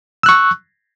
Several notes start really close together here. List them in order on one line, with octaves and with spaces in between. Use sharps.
E6 F#6 C#6